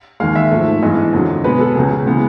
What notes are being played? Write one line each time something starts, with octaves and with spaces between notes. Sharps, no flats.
D#2 D#3 G#3 F5
E5
G#2 F3 A3
G2 E3 G#3 B3 D#5
F2 D3 F#3
B2 G#3 B3 B4
A4
C#2 C#3 F#3 G#4
C#3 E3 G#3 B3